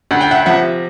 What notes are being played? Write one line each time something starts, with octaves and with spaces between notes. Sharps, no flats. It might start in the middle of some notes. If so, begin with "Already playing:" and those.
D2 F#5
G5
E5 F#5
C3 F3 E5 F#5